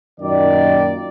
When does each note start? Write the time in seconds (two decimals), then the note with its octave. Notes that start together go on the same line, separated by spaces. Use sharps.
0.21 F#2 A#2 D#3 D5